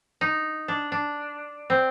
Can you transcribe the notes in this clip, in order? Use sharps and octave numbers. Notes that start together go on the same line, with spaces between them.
D#4
D4
D4
C4